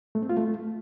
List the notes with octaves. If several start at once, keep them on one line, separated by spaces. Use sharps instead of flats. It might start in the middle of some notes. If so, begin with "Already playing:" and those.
A3
C4
F4
A3